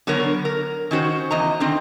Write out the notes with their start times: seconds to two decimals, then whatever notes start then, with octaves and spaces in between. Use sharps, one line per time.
0.07 D3 F#3 B3 A#4 C#5
0.45 A#4
0.91 D#3 C#4 F#4 C5
1.31 E2 D#5 A#5
1.60 D3 D#3 C4